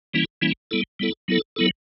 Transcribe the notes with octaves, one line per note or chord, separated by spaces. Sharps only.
E3 G3 A#3 C#4 E4
E3 G3 A#3 C#4 E4
G3 B3 E4 A4
G3 B3 E4 A4
F#3 B3 E4 A4
F#3 B3 E4 A4